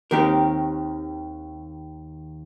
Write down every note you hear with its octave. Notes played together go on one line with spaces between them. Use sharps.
D#2 D#3 C4 G4 A#4